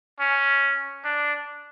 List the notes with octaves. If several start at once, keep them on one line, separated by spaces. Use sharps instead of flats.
C#4
D4